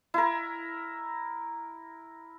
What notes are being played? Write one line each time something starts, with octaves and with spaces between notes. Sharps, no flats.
E4 A#4